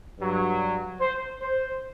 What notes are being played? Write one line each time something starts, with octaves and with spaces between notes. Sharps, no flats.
G2 F#3
C5
C5